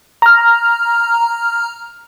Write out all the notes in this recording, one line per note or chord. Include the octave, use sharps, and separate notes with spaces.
A#5 F6